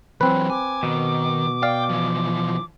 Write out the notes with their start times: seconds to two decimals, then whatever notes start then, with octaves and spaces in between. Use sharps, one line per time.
0.21 E3 F#3 C4 B4
0.50 G#5 D6
0.83 B2 D#3
1.63 D5 F5 G5
1.89 E3 F3